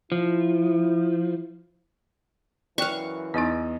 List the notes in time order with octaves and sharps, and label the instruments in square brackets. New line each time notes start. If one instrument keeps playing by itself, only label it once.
[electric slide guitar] F3 [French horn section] E4
[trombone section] F#2 E3 [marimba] D5 G5 F#6 [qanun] F5 C#6
[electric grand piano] E2 D#5 A6 [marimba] B3 D#4